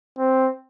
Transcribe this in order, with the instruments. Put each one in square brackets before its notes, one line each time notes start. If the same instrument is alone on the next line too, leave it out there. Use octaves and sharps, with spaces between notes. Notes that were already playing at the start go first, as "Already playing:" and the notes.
[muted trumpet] C4